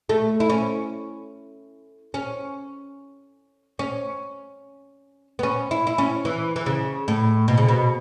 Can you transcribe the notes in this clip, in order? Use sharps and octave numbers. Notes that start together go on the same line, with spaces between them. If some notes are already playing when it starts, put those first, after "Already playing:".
A3
E4
C#4
C#4
C#4
B3
C#4
E4
E4
C#4
E3
E3
C#3
A2
B2
C#3
B2